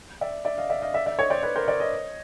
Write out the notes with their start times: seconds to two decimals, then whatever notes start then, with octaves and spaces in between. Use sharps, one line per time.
0.21 D5 E5
0.45 D5 E5
0.58 D#5 F5
0.70 D5 E5
0.82 D#5 F5
0.94 D5 E5
1.06 D5 E5
1.19 C#5 D#5
1.30 C5 D5
1.43 B4 C#5
1.55 A#4 C5
1.68 C5 D5
1.80 C#5 D#5